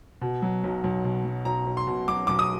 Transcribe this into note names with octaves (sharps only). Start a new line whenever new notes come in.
B2
F#3
B1
B1
B2
F#3
B1 A#5
B1
C6
B2
F#3 D6
B1 D6
D#6